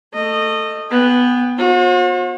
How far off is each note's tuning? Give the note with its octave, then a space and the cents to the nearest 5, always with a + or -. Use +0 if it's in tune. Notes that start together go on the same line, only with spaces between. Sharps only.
A3 +15 D#5 -15
B3 +0 G5 +35
F#4 -45 C5 +40